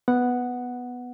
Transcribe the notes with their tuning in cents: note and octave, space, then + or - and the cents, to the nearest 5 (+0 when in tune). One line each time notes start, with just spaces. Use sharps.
B3 +0 F#5 +0